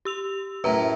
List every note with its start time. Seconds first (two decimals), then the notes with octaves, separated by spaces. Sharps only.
0.05 G4 E6 F7
0.64 F#2 A2 B4 A#5